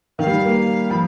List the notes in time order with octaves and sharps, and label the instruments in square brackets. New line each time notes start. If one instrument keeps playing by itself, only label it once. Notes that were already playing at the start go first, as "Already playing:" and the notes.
[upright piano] D#3 [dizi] F5
[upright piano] G3
A#3
[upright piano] F3 [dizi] B5